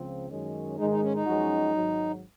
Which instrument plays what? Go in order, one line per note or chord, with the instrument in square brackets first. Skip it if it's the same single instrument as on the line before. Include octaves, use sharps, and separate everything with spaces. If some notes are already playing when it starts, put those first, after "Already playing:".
Already playing: [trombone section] C#2 C#3 F3 C4 F4
F#2 D#3 G#3 C#4
[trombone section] G#2 D#3 G#3 [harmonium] D#4
[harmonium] D#4
C#4
D#4
[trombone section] F#2 F3 G#3 C#4 F#4
G#1 G#2 F#3